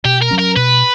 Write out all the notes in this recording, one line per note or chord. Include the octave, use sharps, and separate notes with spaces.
B2 G4
A#4
F#3 C#4
A#4
B2 B4